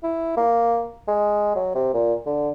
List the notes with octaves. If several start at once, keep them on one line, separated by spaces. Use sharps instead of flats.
E4
A#3
G#3
F#3
C3
A#2
D3